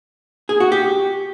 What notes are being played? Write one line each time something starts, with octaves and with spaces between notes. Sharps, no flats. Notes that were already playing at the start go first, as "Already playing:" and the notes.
G#4
F#4
G4